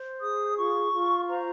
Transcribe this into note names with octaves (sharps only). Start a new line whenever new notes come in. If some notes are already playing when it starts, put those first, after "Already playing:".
Already playing: C5
G#4 D#6
F4 C#6
F4
C5 A#5